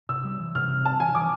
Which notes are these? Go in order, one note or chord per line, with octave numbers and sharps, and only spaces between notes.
C3 E6
G3
E3
C3 F6
C3
G3 A5
E3 G#5
E3 D6